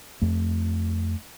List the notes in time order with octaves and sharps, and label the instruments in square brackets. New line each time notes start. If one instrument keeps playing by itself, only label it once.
[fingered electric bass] F2 A3